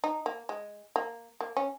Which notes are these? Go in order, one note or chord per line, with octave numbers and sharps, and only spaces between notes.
D#4
A#3
G#3
A#3
A#3
C#4